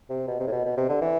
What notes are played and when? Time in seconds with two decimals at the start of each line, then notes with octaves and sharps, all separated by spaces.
0.10 C3
0.28 B2
0.40 C3
0.47 A2
0.52 B2
0.65 B2
0.77 C3
0.89 D3
1.02 E3